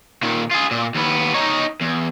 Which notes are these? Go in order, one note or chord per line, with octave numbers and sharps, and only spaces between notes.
A#2 D#3
F4 G#4
A#2
D#2 B3
D#4 C#5
E2